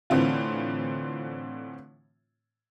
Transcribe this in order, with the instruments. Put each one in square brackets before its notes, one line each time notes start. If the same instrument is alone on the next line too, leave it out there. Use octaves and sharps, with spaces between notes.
[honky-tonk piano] A2 D3 E3 C4 F4